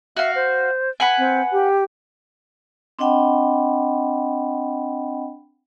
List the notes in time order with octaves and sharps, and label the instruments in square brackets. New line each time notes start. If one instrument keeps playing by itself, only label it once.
[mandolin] F#4 F5 [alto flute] E5
[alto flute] C5
[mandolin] B4 F#5 G#5
[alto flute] C4
G4
[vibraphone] C4 D4 D#5 F#5 G5 B5